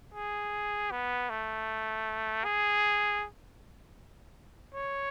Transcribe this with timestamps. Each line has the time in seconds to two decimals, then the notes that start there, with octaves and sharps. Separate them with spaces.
0.14 G#4
0.91 B3
1.30 A3
2.44 G#4
4.74 C#5